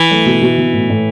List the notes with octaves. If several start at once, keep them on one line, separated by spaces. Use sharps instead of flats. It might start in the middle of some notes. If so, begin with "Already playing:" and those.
Already playing: E3
A3
B2
B2
B2
A2
A2